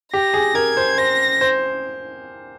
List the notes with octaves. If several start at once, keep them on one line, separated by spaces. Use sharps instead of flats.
G4 A#6
G#4
A#4 G#6
C5
C5 A#6
C5